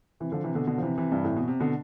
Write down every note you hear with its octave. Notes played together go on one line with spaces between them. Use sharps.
C3 E3
D3 F3
C3 E3
B2 D3
B2 D3
F3
C3 E3
C3 E3
G2
A2
B2
C3
B2 D3